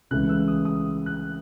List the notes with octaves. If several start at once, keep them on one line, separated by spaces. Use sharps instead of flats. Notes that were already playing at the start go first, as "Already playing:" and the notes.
C#2 C#3 E3 A3 C#4 F#6
E6
D#6
D#6
F#6